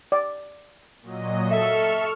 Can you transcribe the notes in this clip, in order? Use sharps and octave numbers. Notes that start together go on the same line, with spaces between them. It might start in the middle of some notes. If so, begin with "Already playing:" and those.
D5
A#2 F#3 D#5
A4 E5 C#6 F6 C#7